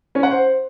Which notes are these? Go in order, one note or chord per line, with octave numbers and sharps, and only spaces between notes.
C#4
F#5
C5